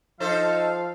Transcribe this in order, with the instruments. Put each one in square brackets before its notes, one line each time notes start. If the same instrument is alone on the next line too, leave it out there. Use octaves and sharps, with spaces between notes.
[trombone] F3 [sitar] D#4 A4 C5 [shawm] F5